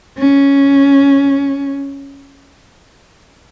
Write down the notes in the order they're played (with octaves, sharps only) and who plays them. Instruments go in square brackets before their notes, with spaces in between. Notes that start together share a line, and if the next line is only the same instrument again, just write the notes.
[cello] C#4